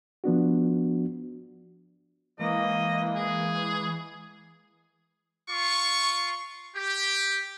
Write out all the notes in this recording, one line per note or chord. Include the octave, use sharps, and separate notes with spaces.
F3 B3 D4 F#4
E3 G#3 A#3 D#5
G#4
F4 C#6
G4